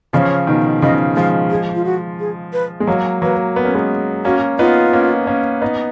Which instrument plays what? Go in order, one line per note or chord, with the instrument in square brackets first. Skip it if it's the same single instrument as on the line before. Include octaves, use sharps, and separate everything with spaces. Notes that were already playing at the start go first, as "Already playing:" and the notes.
[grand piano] C#3 F3 [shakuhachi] C#5 D#5
[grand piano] B2 D#3
[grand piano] C#3 F3 [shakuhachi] D#5
[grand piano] F3 G#3 [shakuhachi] F5
[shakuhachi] G#4
F4
F#4
G#4
B4
[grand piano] G#3
[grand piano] F#3 A#3 [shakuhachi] C#5
[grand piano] F#3 A#3 [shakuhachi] B4
[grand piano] B3 [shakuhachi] B4
[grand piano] C#4 [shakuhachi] A#4
[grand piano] G#3 B3
[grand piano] A#3 C#4 [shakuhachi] F#4
[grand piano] B3 D#4 [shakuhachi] F4
[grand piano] A#3 C#4
A#3 C#4
B3 D#4